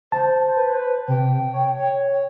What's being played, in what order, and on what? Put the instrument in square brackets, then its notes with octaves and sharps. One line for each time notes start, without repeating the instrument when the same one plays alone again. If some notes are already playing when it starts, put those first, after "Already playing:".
[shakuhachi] C5 [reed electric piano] A5
[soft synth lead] B4
[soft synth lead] C3 [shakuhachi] G5
[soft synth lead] C#5